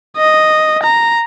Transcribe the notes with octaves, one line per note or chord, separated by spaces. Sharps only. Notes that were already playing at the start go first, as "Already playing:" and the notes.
D#5
A#5